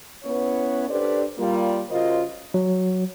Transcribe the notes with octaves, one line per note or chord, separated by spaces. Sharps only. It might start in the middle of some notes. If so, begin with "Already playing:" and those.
B3 C#4 E4 B4 C#5
D4 G4 A4 B4 C5 D5
G3 A#3 F4
C#3 F4 F#4 A#4 C5 D#5
F#3